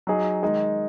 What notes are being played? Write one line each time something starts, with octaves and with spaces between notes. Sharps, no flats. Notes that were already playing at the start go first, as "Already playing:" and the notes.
F#3 D#4 G#4
D#3 G#3 D#4